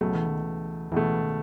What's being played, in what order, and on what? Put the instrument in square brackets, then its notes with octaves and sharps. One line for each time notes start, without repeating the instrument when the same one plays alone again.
[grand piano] C#2 B2 A3 [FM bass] F#3
[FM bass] E3
D#3
E3
[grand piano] C#2 B2 A3 [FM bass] E3
[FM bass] D#3